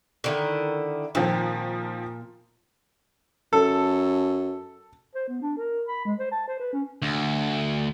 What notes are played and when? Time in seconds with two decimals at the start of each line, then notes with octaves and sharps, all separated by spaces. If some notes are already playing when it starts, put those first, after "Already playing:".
0.24 D3 D#3 E4
1.15 A#2 D#3 F3 C4
3.53 F#2 A4
5.15 C5
5.28 B3
5.41 D4
5.57 A#4
5.87 B5
6.05 G#3
6.20 C5
6.31 A5
6.48 C5
6.60 B4
6.72 C#4
7.02 D2